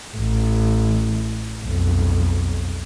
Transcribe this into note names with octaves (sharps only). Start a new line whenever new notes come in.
A1
B1 F2